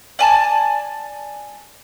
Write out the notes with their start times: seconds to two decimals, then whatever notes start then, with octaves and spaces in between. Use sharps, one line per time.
0.19 D5 G#5 A5